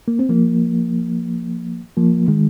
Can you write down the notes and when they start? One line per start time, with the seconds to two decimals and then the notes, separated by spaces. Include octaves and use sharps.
0.08 A#3
0.19 C4
0.29 F3 A#3
1.97 F3 A#3
2.28 D#3 G#3